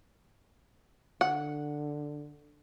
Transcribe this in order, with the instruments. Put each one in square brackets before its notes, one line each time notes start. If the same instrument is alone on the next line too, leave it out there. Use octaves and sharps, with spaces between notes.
[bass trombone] D3 [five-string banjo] F#5